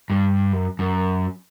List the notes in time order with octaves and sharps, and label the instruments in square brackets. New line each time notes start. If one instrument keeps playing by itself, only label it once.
[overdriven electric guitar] G2
F#2
F#2